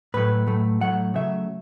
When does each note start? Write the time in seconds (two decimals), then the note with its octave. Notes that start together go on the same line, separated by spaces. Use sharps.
0.14 A2 F#3 A3 B4
0.47 A2 F#3 A3
0.81 A2 F#3 A3 F#5
1.14 C#3 F#3 A3 E5